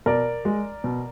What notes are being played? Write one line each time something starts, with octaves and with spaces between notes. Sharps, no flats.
B2 A#4 D5
G#3
B2